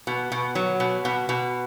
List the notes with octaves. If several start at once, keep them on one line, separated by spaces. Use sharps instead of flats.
B2
B2
F#3
B2
B2
B2